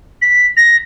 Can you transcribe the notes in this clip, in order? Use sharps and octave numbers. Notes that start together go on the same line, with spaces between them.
B6
A#6